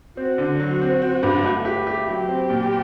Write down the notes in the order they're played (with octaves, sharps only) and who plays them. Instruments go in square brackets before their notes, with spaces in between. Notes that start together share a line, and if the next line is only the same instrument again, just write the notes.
[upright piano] C4 [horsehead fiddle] F#4
[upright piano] D3
F#3
C4
C4
G2
A3
G4
G4
[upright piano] F#3 [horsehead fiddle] G4
[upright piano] C4
A#2